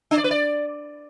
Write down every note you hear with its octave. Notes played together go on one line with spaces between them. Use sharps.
D4
D5
B4
D5